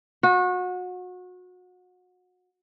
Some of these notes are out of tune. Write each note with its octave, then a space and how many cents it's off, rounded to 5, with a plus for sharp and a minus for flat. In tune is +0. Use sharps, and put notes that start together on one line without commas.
F#4 -30